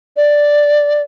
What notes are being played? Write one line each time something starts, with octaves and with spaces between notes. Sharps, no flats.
D5